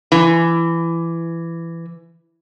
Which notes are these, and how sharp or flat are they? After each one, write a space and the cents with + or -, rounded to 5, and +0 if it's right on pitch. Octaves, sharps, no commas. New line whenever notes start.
E3 +20